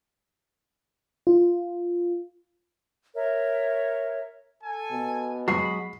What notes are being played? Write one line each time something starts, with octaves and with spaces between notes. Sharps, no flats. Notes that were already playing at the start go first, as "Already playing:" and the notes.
F4
A#4 C#5 E5
A4 G#5
B2
F#3 G#3 F#4 G#4 D#5 B5 C7